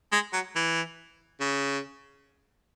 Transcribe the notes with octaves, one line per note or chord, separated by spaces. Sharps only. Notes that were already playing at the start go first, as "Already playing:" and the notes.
G#3
F#3
E3
C#3